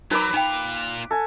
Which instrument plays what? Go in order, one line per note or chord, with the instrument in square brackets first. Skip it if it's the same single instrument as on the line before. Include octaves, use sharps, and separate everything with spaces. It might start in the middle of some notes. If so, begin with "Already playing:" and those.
[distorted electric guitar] F#3 [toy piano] D#4 A#4 A#5 [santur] B4 B5 D6
[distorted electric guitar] A#2 F5 [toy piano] D#4 G5
[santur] A4 G#5